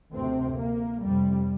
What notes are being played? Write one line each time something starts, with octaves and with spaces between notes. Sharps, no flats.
D2 C3 C4
A#3
F1 F2 C3 G3